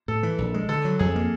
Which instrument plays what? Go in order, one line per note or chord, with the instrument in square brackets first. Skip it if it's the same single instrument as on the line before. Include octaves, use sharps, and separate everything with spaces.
[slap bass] A2 [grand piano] A4
[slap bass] E3
A#1
G#3
[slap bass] D3 [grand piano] A4
[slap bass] F#3
[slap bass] F2 [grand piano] G#4
[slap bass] A#3